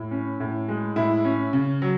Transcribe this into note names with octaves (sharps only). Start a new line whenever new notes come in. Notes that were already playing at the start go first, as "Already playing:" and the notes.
Already playing: A2
C#4
A2
G#3
A2 E4
C#4
C#3
F#3